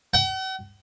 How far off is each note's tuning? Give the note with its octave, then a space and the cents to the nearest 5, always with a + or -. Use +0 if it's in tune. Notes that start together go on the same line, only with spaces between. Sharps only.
F#5 +45